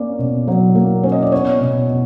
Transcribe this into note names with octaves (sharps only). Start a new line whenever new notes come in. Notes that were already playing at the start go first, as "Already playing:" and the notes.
Already playing: A#3 C#4 D5
B2
F#3
A#3
C#4
D#5
D5
B3 C#5
B2
B2